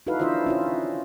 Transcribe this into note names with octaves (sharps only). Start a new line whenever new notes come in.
D#4 E4 F#4 A4 B4 F5
D4 E4 F4 C5 D#5 E5
C#4 D#4 F4